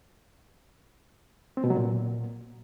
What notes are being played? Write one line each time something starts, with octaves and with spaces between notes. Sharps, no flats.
C4
B2
F#3
A#2